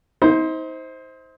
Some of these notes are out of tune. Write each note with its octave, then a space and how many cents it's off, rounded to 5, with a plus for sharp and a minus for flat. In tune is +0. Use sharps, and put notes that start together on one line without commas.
D#4 +40 C5 +0